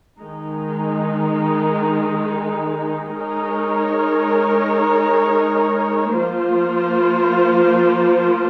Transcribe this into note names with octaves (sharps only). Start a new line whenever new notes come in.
D#3 G#3 D#4
G#3 D#4 A#4 C#5
F3 A#3 F4 C5